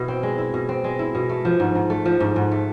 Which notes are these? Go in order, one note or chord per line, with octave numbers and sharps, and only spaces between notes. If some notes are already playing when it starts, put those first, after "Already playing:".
Already playing: B2 E4
C4
G#3
E4
B2
C4
G#3
E4
B2
A3
F3
G#2
G#2
A3
F3
G#2
G#2
A3